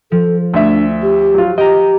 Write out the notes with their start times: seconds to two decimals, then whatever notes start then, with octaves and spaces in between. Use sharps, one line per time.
0.12 F3 A4
0.54 D2 D4 E5
1.02 G4
1.34 F#3 F4
1.58 G4 D#5 G5 A#5